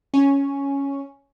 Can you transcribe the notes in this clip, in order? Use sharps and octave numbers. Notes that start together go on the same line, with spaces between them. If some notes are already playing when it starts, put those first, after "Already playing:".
C#4